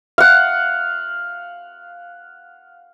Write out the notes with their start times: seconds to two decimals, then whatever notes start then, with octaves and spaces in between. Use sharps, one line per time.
0.18 F5 F#5